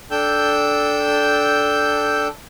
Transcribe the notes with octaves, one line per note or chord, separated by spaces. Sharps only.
D4 A4 G5 E6 G6